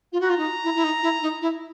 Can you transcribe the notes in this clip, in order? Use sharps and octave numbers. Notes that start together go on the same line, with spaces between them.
F4
F#4
F4 A#5
D#4
E4
E4
D#4
E4
D#4
E4